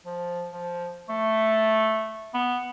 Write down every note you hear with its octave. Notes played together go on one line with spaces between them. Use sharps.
F3
F3
A3
B3